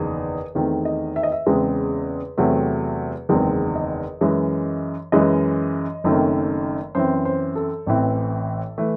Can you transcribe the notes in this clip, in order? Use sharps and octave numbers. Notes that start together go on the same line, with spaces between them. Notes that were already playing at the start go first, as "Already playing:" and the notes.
Already playing: F#1 E2 D#3 G#4
E2 D#3 A3 C4
D#5
E5
D#5
E5
E2 C#3 G#3 C4
E2 C3 F#3 A3 C4
F#1 E2 D#3 G#3 C4
D#5
F#2 E3 G#3
F#2 E3 G#3 D#5
F#1 F#2 D#3 A3 C4
F#2 E3 C4 C5
C5
A4
A1 A2 E3 C4
E3 A3